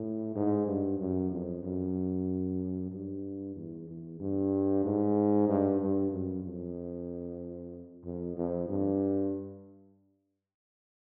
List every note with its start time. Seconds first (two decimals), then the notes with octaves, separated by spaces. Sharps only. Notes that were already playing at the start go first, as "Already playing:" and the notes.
Already playing: A2
0.36 G#2
0.67 G2
0.99 F#2
1.31 F2
1.64 F#2
2.92 G2
3.56 E2
3.88 E2
4.20 G2
4.85 G#2
5.49 G2
5.81 G2
6.12 F#2
6.45 F2
8.05 F2
8.37 F2
8.69 G2